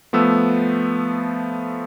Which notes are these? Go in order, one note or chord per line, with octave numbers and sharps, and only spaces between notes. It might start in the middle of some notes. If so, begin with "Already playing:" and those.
F3 A3 B3 E6